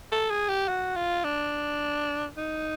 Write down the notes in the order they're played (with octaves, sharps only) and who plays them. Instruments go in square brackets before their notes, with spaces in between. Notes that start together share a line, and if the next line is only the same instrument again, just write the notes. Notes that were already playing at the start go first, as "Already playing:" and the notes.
[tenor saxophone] A4
G#4
G4
F#4
F4
D4
D#4